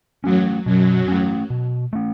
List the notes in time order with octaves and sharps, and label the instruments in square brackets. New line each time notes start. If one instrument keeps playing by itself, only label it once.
[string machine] F#2 F#3 [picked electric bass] A3 C#4
[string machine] F#2 F#3 [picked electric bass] B2
[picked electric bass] A3 C#4
B2
A3 C#4